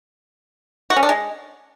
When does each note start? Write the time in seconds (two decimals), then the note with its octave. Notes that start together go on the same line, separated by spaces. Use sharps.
0.90 F#4
0.96 C#4
1.03 D4
1.09 G#3